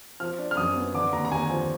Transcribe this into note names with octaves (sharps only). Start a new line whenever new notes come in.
F3 F6
D4
F6
F#2 D#6
B3
D3 D6
D#2 A#5
A#5
D#2 G#5
F3